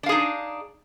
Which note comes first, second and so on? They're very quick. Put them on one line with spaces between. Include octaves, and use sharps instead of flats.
D4 F5 G#4 D#4